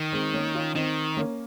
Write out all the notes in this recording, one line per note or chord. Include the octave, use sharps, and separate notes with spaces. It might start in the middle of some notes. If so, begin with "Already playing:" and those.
Already playing: D#3
G#3 C4
A#3 C#4
C#4 F4
D#3 C4 D#4
A#3 C#4